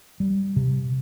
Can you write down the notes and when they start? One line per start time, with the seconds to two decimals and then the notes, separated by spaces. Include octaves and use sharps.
0.20 G3
0.56 C3